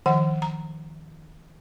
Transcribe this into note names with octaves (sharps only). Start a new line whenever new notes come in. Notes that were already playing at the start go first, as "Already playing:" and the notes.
D#3 F3 F#5
A#5